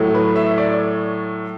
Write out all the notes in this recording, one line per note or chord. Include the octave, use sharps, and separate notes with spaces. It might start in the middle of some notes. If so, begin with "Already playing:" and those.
Already playing: A2 F#3 A3
B4
E5
D5